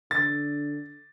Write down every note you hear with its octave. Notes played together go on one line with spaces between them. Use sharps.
D3 A6